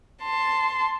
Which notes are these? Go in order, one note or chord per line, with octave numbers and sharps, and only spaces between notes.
A5 C6